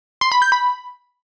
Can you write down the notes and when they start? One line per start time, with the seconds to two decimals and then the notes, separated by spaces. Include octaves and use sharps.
0.21 C6
0.32 B5
0.42 G6
0.52 B5